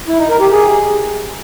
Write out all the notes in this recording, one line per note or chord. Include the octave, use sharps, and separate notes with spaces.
E4
D#4
A#4
G4
G#4